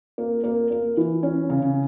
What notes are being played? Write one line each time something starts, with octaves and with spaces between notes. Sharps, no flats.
A#3
A#3
A#3
E3
C#4
C#3